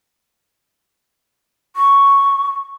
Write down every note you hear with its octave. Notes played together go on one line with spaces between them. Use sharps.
C#6